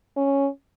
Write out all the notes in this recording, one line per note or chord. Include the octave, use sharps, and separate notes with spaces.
C#4